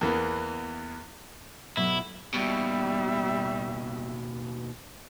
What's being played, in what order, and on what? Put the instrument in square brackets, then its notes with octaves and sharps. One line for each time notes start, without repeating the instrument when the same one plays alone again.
[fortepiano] E2 E3 A#3 B3
[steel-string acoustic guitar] B2 F#3 A3 [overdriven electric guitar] E4
[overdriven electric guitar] D#2 B2 [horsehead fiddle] G3 E5